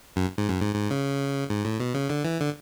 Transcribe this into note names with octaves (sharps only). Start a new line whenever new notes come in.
F#2
G#2
F#2
G#2
G#2
C#3
G#2
A2
B2
C#3
D3
E3
D3